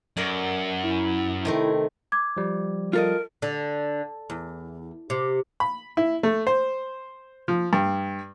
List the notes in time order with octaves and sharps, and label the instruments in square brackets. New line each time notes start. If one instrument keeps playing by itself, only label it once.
[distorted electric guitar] F#2 [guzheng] A#4 D5
[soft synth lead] E4
[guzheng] C3 D#3 A3
[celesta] D6 G#6
[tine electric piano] F3 G3
[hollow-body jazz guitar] F4 A4 D#5 [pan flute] A#4
[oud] D3
E2
C3
[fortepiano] B5
E4
A3
C5
F3
G2